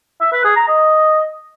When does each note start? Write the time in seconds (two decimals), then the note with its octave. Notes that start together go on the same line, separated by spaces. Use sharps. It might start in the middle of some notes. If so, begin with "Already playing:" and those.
0.21 E5
0.33 B4
0.45 G#4
0.56 A#5
0.68 D#5